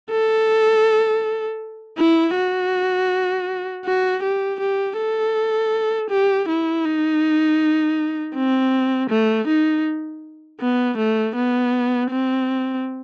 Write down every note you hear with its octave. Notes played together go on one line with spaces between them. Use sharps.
A4
E4
F#4
F#4
G4
G4
A4
G4
E4
D#4
C4
A3
D#4
B3
A3
B3
C4